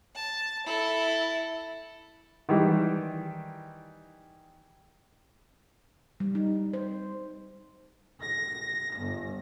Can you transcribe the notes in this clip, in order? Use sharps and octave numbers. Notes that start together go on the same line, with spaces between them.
A5
E4 A4
D#3 E3 G3
G3
D#4
C5
A#6
G1